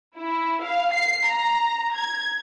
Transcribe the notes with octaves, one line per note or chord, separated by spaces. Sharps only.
E4
F5
C7
A#5
G#6